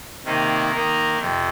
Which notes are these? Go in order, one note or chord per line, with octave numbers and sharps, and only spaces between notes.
C3 D#3 A#3 D#4
D#3 A#3 D#4 A#4
F2 C3